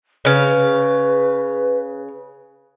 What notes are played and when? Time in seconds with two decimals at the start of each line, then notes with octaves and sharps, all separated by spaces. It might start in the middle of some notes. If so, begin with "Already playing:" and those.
0.25 C#3 B4 F5